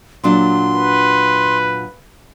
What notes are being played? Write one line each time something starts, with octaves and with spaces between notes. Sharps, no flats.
A#2 F#3 D4 C6
B4